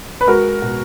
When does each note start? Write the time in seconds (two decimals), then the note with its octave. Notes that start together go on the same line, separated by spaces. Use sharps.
0.21 B4
0.27 G#3 F#4 A#4
0.62 B2